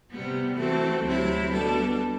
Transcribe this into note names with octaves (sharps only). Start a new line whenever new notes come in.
C3 G3 B3
E3 A3 C4 F#4 A4
D2 C3 F#3 C4 E4
B2 G3 D4 A4